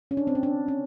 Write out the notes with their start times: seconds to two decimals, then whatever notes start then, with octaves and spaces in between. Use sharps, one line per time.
0.11 C#4
0.17 D4
0.27 C4
0.35 C#4
0.43 D4
0.68 C#4